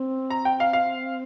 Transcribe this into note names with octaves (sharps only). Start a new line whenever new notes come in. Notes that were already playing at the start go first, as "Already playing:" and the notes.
Already playing: C4
A#5
G5
F5
F5